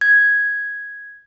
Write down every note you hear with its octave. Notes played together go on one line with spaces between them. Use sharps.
G#6